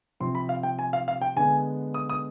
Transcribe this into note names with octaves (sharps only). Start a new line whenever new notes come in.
C3 F3 C4 C6
B5
F5
G5
G#5
F5
F5
G5
D3 G#3 B3 G#5
D#6
D#6